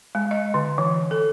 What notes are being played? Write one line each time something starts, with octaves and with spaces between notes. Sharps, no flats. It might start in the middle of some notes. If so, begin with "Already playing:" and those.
G#3
D#5
D3
E3
A4